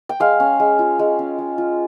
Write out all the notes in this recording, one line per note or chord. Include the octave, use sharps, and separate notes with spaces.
G5
G#3 F5
C#4
G#3
F4
G#3
C#4
G#3
F4